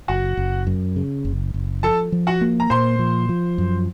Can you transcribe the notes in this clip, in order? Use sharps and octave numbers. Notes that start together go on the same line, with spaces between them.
F#1 F#4 F#5
F#1
F#2
C#3
F#1
F#1
F3 A4 A5
F3
F#4 F#5
A#3
A#5
A#2 C5 C6
F3
F3
F#2